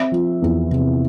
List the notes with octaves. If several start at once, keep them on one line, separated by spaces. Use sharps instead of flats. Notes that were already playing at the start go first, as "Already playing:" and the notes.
Already playing: C4 E5
F3
E2
C3